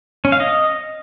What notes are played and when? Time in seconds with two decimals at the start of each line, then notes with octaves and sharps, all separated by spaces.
0.25 C#4
0.32 F5
0.40 D#5